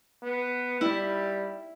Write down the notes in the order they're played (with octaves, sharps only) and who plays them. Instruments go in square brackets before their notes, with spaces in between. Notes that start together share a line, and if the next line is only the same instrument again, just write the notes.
[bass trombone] B3
[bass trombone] G3 [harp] E4